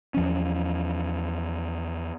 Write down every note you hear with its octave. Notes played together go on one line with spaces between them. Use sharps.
E2 F3 C#4